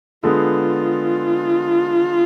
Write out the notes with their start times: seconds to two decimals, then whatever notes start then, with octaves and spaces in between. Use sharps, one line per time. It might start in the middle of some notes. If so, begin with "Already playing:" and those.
0.24 D3 G#3 B3 F4